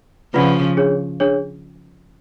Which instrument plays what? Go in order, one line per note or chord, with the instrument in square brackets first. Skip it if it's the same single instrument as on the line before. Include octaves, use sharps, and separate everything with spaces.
[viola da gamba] C#3 F3 [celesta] F4 B4 D5 F#5 B5
[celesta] D4 G#4 C#5
D4 G#4 C#5